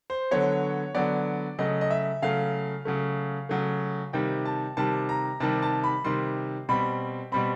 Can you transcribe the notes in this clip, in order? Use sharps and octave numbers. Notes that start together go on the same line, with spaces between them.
C5
D3 F#3 B3 C#5
D3 F#3 B3 D5
C#3 F#3 A3 D#5
D#5
E5
C#3 F#3 A3 F5
C#3 F#3 A3
C#3 F#3 A3
C3 D#3 G3 G5
A5
C3 D#3 G3 A5
A#5
C3 D#3 G3 A5
A5
B5
C3 D#3 G3 C6
B2 G3 C4 B5
B2 G3 C4 B5